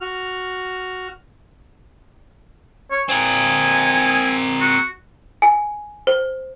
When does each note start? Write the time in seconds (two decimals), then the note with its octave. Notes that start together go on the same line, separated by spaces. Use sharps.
0.01 F#4 F6
2.91 C#5
3.09 C4 A#4 G#5
4.61 F#4
5.42 G#5
6.07 C5